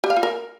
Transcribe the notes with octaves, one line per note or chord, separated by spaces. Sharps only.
G4
F5
F4
A#4